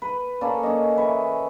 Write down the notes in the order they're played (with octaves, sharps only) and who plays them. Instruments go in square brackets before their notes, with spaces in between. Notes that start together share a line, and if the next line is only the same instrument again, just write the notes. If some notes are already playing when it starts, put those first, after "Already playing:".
[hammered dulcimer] B4
A#3 C#4 A4 D5
C#4 D#5
E3 B4 C#6